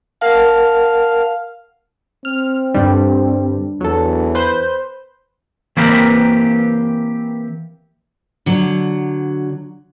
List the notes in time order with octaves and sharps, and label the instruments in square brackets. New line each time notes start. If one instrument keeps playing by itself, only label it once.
[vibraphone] A#4 F#5 A5 [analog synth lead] F5
[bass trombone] C4 [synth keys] F6
[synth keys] G2 D3 G3 [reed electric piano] D4
[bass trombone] E2 [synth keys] F#3 A4
[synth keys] B4 C5 G6
[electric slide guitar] E3 A#3 C4 G4 A#4 B4
[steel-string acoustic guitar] D3 F#3